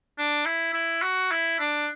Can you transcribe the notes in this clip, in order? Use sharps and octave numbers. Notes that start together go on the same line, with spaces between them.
D4
E4
E4
F#4
E4
D4